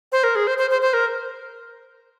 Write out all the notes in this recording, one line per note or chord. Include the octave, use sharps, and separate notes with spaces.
C5
A#4
G#4
C5
C5
C5
C5
A#4